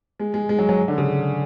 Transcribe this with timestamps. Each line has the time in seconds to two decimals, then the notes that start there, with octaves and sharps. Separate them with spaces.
0.20 G#3
0.34 G#3
0.49 G#3
0.59 F#3
0.69 F#3
0.88 D3
0.98 C#3